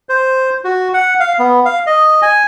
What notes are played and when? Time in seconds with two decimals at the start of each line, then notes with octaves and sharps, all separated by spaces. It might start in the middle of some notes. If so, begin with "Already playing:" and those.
0.09 C5
0.64 F#4
0.94 F#5
1.20 F5
1.39 B3
1.65 F5
1.86 D#5
2.22 G#5